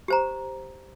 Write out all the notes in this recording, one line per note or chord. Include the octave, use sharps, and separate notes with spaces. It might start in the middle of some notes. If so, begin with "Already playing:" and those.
G4 C5 A#5